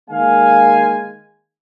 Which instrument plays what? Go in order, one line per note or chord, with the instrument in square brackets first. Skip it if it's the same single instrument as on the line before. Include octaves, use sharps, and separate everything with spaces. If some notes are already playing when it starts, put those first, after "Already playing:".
[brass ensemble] D#3 G#3 A#3 F5 G#5